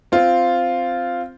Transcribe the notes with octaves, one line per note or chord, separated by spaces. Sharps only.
C4 F4